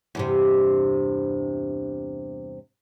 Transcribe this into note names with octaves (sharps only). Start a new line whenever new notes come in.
E2 G2 C3